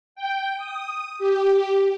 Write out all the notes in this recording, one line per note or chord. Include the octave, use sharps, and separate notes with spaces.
G5
D#6
G4